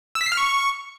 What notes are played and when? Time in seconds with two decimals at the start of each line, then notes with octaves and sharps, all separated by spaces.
0.15 E6
0.21 B6
0.26 C7
0.32 F6
0.37 C#6